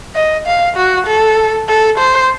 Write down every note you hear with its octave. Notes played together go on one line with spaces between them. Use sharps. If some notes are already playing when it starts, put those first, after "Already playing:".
D#5
F5
F#4
A4
A4
C5